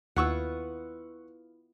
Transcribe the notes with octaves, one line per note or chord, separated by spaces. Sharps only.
D#2 B3 E4 F4 F#5 C#6 E6